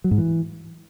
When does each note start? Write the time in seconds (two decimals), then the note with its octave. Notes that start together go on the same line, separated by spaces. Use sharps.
0.04 F#3
0.11 G#2
0.18 E3